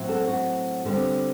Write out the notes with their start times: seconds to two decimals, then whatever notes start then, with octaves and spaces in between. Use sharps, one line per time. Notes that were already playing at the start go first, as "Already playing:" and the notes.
Already playing: A2 F#3 C4
0.09 F#4 A4
0.28 F#4
0.85 D3 G3 C4